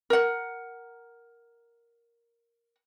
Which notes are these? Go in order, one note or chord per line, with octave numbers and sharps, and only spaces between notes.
A#4 F#5